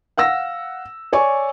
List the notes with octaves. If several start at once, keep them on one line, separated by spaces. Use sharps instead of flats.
F5 F#5 E6 A#6
C#5 D5 G#5 C#6